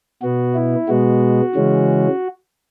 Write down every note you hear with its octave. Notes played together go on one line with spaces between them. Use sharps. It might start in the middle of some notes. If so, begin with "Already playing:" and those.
B2 B3 F#4
E4
B2 G#3 B3 F#4
C#3 E3 G#3 C#4